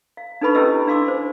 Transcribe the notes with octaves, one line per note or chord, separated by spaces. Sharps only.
F5
D4 D#4 A4 B4 B5 C#6
C#4 E4 G4 A4 D#5 E6
D4 F5 C6 D6 E6
C5